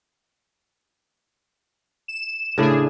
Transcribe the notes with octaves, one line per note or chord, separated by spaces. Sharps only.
E7
A2 C#3 D4 G#4